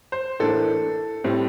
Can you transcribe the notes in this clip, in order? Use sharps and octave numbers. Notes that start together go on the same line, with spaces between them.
C5
A2 E3 A#3 D4 A4
A2 G3 C4